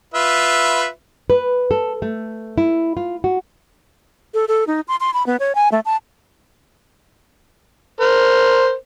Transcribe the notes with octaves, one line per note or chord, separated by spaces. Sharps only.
F4 B4 E5
B4
A4
A3
E4
F4
F#4
A4
A4
D#4
C6
C6
B5
B3
C#5
G#5
A3
A5
A#4 C5